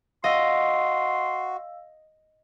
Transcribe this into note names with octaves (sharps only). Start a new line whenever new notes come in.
F#4 D#5 F5 C6 E6